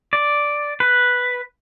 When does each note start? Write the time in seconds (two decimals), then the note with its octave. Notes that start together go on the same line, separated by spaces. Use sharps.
0.13 D5
0.80 B4